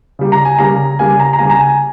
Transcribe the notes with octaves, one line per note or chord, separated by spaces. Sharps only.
C#3 G3 A#3
A#5
G#5
C#3 G3 A#3 A#5
C#3 G3 A#3 G#5
A#5
A#5
C#3 G3 A#3 G#5
A#5
G#5